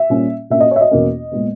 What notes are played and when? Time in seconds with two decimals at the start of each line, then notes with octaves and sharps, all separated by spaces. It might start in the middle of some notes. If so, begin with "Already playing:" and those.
Already playing: E5
0.10 A#2 G3 C#4
0.50 A#2 A#3 C#4 E5
0.60 D#5
0.71 C#5
0.76 E5
0.81 D#5
0.91 E2 B2 A#3 C#4
1.32 A#2 G#3 B3